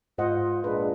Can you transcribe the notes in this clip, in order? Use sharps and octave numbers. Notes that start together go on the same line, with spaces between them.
G#2 F4 C5 D#5 F#5
A#1 A#2 G#3 D4 B4